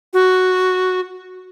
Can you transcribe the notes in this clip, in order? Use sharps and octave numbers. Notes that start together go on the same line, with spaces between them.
F#4